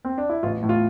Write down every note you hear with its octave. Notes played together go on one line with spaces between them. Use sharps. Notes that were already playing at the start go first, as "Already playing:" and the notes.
C4
D4
E4
A1 F4
A2
F4